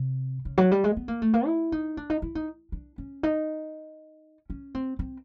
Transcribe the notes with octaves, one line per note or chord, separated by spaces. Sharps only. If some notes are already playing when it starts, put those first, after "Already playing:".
Already playing: C3
C#3
F#3
G3
G#3
B3
A#3
A3
A#3
E4
D#4
D4
D#4
E4
D#4
D4
C#4
D#4
C#4
C4
C4